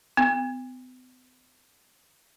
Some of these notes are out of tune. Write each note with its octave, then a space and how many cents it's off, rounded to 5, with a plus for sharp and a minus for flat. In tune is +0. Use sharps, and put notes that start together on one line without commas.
B3 +45